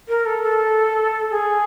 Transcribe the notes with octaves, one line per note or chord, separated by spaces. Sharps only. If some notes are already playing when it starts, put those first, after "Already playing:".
A#4
A4
A4
G#4